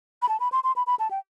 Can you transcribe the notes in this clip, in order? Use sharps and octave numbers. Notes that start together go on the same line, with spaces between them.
B5
A5
B5
C6
C6
B5
B5
A5
G5